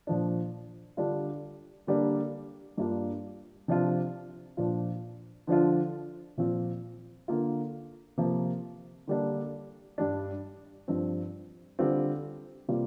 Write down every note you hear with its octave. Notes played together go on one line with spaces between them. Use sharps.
A#2 F3 D4
D3 G3 D4 F4
D3 G3 A#3 D4
G2 G3 A#3 D4 F4
C3 F3 D4 F4
A#2 F3 D4 F4
D3 F3 D4 F4
A#2 F3 C4 F4
D3 A#3 F4
C3 F3 A#3 F4
D3 G3 A#3 D4
G2 G3 D4
G2 F3 C4
D3 G3 C4 F4
C3 G3 A#3 F4